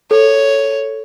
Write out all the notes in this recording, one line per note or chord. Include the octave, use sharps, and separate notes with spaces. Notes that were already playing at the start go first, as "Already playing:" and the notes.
A4 C#5